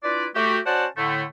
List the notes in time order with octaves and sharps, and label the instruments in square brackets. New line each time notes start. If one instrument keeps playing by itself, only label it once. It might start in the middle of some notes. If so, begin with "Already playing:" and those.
[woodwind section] D4 E4 F4 B4 D5
A3 F#4 G4
C#4 F#4 C5 D5 F#5 A5
A2 D3 A3